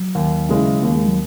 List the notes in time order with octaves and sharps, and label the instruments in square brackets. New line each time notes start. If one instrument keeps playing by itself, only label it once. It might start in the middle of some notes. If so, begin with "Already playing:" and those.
Already playing: [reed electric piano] F#3
[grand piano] D#2
C#3 G#3 C#4 E4
[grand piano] D#2 [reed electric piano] A#3
[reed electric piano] G#3
F#3